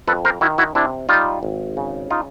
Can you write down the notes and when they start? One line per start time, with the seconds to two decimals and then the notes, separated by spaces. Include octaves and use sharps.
0.07 F2 A4 B4
0.25 A#4 C5
0.41 D#3 E4 F#4
0.58 E4 F#4
0.75 C3 D4 E4
1.09 G3 D#4 F4
1.43 G#1
1.77 C#3
2.10 D#4 F4